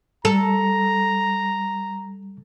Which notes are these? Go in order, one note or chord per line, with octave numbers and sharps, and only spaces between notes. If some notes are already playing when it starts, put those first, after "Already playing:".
G3 A4 A#5